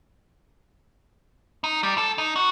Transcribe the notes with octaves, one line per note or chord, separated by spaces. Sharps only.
D#4
G3
A4
D#4
F#4